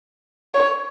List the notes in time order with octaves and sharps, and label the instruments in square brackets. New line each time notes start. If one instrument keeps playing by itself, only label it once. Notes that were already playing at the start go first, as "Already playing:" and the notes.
[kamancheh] C#5